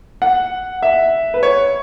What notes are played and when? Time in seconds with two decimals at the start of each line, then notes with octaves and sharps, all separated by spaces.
0.22 F#5
0.83 E5
1.34 B4
1.43 C#5